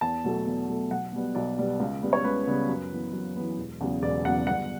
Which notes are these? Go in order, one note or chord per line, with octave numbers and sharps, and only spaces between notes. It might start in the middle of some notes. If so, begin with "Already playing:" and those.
E2 A5
B2 F#3 A3
E2
B2 F#3 A3
B1 F#5
B2 G3 B3
B1 D5
B2 G3 B3
C#2
C#3 G3 B3
C#5
C#2 B4
C#3 G3 B3
F#2
E3 B3
F#2
E3 B3
E1
E2 C#3 F#3
E1 D5
E2 C#3 F#3 F#5
G1 F#5